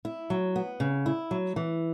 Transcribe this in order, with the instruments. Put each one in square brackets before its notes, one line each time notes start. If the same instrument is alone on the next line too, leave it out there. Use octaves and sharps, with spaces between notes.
[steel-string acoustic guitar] E4
F#3
B3
C#3
E4
F#3
E3